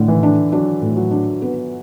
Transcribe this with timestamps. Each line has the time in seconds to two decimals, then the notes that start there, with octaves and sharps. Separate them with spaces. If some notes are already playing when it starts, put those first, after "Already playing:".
Already playing: A2 D3
0.08 E3
0.23 D4
0.52 F#3 D4
0.82 A2
0.96 F#3
1.11 D4
1.42 B3